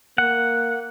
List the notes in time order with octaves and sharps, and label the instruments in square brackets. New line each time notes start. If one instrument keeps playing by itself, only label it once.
[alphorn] A#3 [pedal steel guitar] F#5